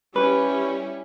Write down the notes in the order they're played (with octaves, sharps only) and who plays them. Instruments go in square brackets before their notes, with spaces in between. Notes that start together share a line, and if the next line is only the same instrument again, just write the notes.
[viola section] G3 C#4 E4 [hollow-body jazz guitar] B4